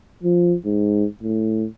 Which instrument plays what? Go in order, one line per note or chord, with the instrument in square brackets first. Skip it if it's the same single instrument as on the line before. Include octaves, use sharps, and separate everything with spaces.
[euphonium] F3
G#2
A2